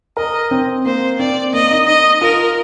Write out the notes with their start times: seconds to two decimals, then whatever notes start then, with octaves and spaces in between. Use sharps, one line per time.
0.17 A#4 D#5
0.51 C4
0.86 A#3 C5
1.19 C4 D5
1.53 A#3 D#5
1.71 D#4
1.87 D#4 D#5
2.21 F4 A#4